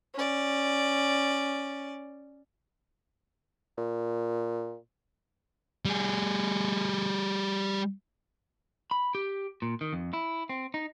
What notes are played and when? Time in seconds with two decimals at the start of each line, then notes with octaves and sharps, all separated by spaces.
0.14 C#4 D5
3.78 A#2
5.85 G3 G#4
8.91 B5
9.15 G4
9.62 A#2
9.81 D#3
9.93 F2
10.13 E4
10.49 C4
10.74 D#4